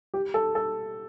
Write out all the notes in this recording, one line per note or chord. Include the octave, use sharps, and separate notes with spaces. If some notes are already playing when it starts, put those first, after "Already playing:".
G4
A4
A4